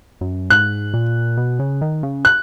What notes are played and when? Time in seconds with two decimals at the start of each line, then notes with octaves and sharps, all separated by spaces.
0.21 F#2
0.50 G#2 F#6
0.94 A#2
1.37 B2
1.59 C#3
1.81 D#3
2.03 C#3
2.25 F#6